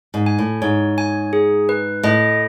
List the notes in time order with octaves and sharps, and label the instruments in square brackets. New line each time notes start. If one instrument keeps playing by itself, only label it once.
[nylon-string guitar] G#2
[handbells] G#5
[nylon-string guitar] A2
[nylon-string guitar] G#2 [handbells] C#5
[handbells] G#5
G#4
B4
[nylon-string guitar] A2 [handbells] D#5